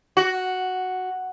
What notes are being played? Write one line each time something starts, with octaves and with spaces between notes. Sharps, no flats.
F#4